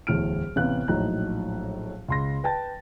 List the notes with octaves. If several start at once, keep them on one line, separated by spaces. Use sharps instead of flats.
D1 E2 A2 F6 D7
A1 C3 B3 C#4 F5 F#6
A#1 A2 F#3 D#4 A#5 F#6
C#2 C6 A#6
B4 G5 A5 A6